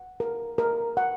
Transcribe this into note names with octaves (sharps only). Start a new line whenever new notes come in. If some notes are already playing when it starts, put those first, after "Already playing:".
Already playing: F#5
A#4
A#4
F#5